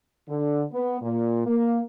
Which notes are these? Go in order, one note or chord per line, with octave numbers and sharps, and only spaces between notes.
D3
B3
A#2
A#3